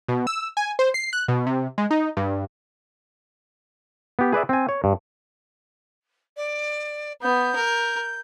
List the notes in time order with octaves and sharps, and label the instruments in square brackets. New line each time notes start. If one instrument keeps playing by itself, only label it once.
[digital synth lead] B2
E6
G#5
C5
C7
F#6
B2
C3
G#3
D#4
G2
[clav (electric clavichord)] B3 G4
G#4 B4 D5 E5
C4 G#5
C#5
G2
[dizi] D5
[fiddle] B3 [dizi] G6
[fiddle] A#4